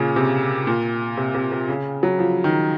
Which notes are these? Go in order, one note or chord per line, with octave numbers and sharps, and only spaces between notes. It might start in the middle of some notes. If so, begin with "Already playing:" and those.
Already playing: A#2 C#3
C3
A#2
C3
C3
C3
C#3
F#3
F3
D#3